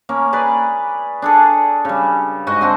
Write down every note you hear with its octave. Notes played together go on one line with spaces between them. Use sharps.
A#3 C#4
G#4 B4 D5
D4 G#4 A4
C#3 G3
G#2 F#4 D#5
D3 C4 F#4